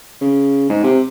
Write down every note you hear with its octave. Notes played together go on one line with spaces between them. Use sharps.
C#3
G#2
C3